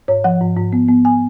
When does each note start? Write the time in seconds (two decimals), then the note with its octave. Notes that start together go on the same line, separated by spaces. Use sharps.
0.08 G#2 C#5
0.24 F3 F#5
0.41 G#2
0.57 G#2
0.73 B3
0.89 B3
1.05 G#5